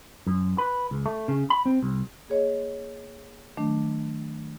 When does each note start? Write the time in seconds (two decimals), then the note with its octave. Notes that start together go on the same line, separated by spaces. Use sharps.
0.27 F#2
0.58 B4
0.91 C#2
1.06 A3
1.28 C#3
1.50 B5
1.66 C4
1.82 C2
2.28 A#3 G#4 C#5 D#5
3.57 D#3 F#3 A3 D4